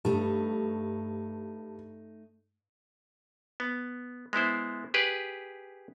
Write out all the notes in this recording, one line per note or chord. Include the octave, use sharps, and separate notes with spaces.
G2 A3 D#4
B3
G#3 B3 E4 C5
G4 G#4 B4